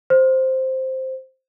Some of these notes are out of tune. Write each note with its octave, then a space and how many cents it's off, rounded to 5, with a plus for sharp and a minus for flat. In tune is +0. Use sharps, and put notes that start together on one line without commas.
C5 +0